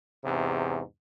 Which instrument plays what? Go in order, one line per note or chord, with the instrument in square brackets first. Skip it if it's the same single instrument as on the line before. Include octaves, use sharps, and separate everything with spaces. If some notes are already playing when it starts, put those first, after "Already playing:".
[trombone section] E2 G#2 C3